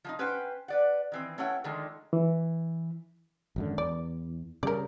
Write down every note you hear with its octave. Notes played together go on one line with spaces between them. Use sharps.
F3 G#3 D#4
C#4 B4 C5 F#5 G5
B4 D5 F#5
D#3 E3 C4
A3 C#4 E4 C#5 F#5 G5
D3 D#3 F3 G#3 A3
E3
G#1 F#2 D3
E2 D5
C#3 G3 A#4 D5